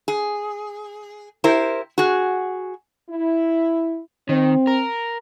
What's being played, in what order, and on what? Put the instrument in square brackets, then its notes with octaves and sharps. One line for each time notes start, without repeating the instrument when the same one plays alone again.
[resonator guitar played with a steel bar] G#4
E4 G4 A#4 C5
F#4 G#4
[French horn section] E4
[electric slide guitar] D#3 [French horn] C4
[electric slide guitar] A#4